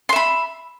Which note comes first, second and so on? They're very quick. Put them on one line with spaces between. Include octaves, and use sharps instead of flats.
C6 E5 B5